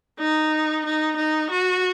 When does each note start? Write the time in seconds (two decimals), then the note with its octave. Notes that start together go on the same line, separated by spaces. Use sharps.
0.19 D#4
0.85 D#4
1.17 D#4
1.50 F#4